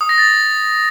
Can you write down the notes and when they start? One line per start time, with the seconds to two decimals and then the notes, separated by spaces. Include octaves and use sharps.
0.01 D#6
0.09 A#6
0.18 A6